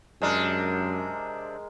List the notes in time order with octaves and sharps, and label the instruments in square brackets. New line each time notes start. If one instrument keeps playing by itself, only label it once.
[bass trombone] F#2 [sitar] C3 D4 [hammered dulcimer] G#3 A#4